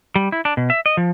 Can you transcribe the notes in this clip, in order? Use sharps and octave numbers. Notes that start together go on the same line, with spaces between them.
G3
E4
D4
B2
E5
D#5
F3